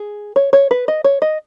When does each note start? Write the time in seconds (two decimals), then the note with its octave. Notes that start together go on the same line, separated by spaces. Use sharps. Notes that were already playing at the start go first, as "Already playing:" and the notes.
Already playing: G#4
0.36 C#5
0.53 C#5
0.71 B4
0.88 D#5
1.04 C#5
1.22 D#5